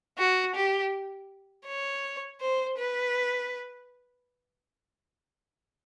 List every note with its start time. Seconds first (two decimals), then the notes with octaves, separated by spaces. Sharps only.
0.19 F#4
0.55 G4
1.67 C#5
2.41 C5
2.78 B4